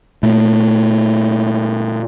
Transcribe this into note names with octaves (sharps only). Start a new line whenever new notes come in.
A#2 A3